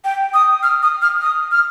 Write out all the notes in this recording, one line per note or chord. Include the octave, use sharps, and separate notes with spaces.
G5
D#6
F6
D#6
F6
D#6
F6